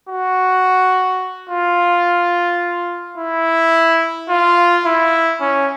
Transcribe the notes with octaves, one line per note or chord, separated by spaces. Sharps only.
F#4
F4
E4
F4
E4
C#4